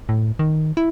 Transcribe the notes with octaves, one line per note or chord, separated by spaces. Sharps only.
A2
D#3
E4